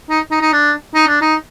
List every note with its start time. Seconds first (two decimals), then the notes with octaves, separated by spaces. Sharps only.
0.10 D#4
0.31 D#4
0.41 D#4
0.53 D4
0.95 D#4
1.08 D4
1.21 D#4